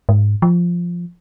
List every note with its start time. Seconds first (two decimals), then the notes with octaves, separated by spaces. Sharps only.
0.09 G#2
0.42 F3